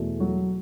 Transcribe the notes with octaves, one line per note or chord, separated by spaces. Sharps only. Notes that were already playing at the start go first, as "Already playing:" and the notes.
Already playing: E2 B2 A3
F#3 F#4